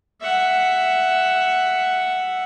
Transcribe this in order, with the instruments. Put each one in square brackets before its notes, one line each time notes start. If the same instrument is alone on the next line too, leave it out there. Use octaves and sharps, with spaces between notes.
[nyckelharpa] E5 F#5